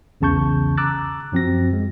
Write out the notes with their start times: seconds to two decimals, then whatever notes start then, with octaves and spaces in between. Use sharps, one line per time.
0.21 B1 E2 C#3 A5 C#6 G6
0.77 A#5 D6 E6 F#6 A6
1.32 F#2 F3 C4 F#4 A#6
1.73 G#3